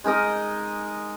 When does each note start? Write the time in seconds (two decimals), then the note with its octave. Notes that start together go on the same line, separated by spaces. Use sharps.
0.04 G#3 D#4 A#4 D#5